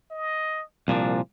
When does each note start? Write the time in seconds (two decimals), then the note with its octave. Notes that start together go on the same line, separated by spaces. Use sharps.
0.11 D#5
0.88 C2 A#2 F3 D4